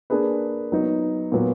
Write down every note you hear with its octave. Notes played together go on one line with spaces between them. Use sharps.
A#3 D4 G#4 B4
F#3 B3 D#4
A#2 F#3 B3